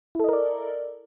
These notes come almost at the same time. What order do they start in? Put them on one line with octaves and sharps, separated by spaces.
E4 A4 D#5 A#4 D5